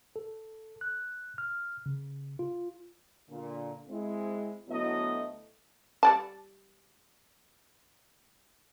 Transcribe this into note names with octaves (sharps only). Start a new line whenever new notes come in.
A4
F#6
F6
C#3
F4
A#2 D3
G#3 C4 E4
D2 F#3 A3 B3 E4 D#5
G3 D5 A5